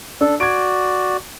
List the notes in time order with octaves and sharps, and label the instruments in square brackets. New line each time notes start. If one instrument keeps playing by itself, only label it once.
[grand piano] D4 [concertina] A4
[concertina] F#4 D5 [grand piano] G#6 D7